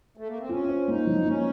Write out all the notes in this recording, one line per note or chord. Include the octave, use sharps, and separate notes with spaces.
A3
A#3
C4
C#4 F4
C5
A#3 D#4
F3
A#3 C#4